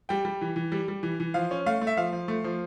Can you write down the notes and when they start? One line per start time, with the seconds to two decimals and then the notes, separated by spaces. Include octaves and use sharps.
0.09 G3 G5
0.25 G3
0.41 E3
0.56 E3
0.72 G3
0.88 G3
1.03 E3
1.20 E3
1.34 F3 F5
1.51 C#4
1.66 A3 F5
1.81 A3
1.87 E5
1.97 F3 F5
2.12 F3
2.28 A3
2.44 F3